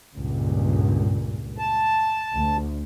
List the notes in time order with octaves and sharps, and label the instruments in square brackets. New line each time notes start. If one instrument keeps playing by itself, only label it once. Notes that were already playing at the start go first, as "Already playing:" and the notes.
[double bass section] C#2 G2 A#2
[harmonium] A5
[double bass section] D2